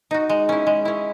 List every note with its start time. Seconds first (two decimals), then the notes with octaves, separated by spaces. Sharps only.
0.11 D#4 F#4
0.29 G#3
0.49 C#4 E4
0.67 G#3
0.85 C#4 E4